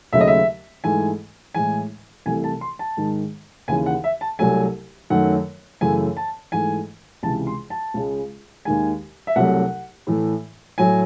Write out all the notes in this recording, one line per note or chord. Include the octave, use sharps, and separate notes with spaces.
D#2 C#3 F#3 A3 E5
D#5
E5
G#2 E3 A3 G#5
A2 E3 G#3 G#5
C2 C3 E3 A3 G#5
A5
C6
A5
G#2 D#3 G#3
D#2 C#3 E3 G#5
F#5
E5
A5
C2 C3 F#3 A3 G#5
F#2 D#3 F#3 A3 F#5
F#2 C#3 E3 A3 G#5
A5
G#2 E3 A3 G#5
C#2 C3 E3 A5
C6
A5
C#2 C#3 G#3
D#2 D#3 G#3 G#5
E5
C2 C3 F#3 A3 F#5
A2 E3 A3
A2 F#3 A3 G#5